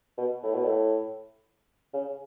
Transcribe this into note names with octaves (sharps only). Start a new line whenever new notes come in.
B2
A2
B2
A2
C#3